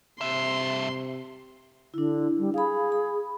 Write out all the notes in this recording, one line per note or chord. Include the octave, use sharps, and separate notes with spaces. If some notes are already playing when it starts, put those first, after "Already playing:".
G2 C3 E5 C6
D3 D4 E4
G3
G#4 F5 B5
B5